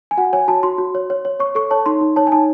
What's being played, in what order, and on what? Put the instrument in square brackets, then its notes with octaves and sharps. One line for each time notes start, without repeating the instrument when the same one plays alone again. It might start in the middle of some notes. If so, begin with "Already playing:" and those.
[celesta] G#5
F#4 F#5
C#5 G#5
F#4 A5
F#4 C6
F#4
C#5
C#5
C#5
C#5 C#6
A4 C#6
C#5 A5
D#4 C6
D#4
C#5 A5
G#5
D#4 A5